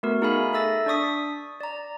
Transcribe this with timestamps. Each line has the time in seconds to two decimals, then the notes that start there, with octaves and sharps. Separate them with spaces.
0.03 A3 B3 F#4 A#4
0.22 D#4 G#4 F5 G#5 B5
0.53 A4 E5 E6 A6 A#6
0.86 D4 D5 C#6 D#6 B6
1.60 D5 A#5